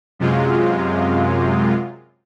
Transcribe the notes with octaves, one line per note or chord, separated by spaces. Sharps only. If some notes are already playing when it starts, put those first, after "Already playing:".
F#2 C3 G#3 F4